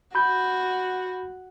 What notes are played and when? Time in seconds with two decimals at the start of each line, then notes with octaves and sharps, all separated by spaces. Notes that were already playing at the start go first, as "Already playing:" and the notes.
0.15 F#4 B5 G6